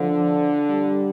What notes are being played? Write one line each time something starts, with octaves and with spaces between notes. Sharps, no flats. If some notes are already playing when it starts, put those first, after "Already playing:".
Already playing: D3 F3
G3